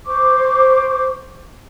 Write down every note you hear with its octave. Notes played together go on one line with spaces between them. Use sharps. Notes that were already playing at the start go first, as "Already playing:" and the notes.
C5 C#6 D6